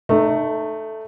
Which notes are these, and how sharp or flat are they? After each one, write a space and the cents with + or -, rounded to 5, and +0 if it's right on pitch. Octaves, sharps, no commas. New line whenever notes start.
A3 +0 D#4 -30